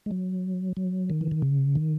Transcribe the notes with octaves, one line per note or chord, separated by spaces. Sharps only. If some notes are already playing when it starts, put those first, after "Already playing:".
G#3
F#3
F#3
D#3
E3
D#3
C#3
D#3